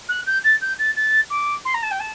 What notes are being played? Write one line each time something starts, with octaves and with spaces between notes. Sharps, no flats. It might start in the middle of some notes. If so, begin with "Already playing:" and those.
F#6
G6
A6
G6
A6
A6
D6
C6
A#5
A5
G5
A5